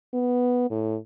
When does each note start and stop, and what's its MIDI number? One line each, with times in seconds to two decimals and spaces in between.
0.13 0.69 59
0.70 0.97 45